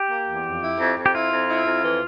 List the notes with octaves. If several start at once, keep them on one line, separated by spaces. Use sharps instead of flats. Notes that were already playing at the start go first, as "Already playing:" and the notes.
Already playing: G4
A#3
E2
F2
E4
F2
F2
G4
E4 F4
F2
E4
F2
E3